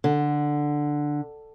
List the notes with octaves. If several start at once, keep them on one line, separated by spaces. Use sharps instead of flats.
D3